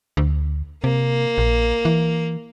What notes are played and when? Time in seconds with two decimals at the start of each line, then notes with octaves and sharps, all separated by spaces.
0.17 D2
0.84 C3 A#3
1.38 A#1
1.85 E3